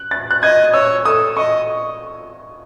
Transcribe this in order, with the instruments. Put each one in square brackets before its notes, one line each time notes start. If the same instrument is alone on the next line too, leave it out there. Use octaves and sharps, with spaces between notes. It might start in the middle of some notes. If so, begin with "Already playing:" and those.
Already playing: [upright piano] F#6
A6
F#6
[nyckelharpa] D#5 [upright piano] G#6
[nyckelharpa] C#5 [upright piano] E6
[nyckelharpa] A4 [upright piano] D#6
[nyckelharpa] D#5 [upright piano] C#6